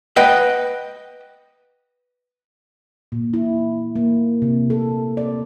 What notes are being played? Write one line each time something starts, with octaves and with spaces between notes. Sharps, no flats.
B4 D#5 F#5 G5
A#2
E4
A#3
C3
A4
D5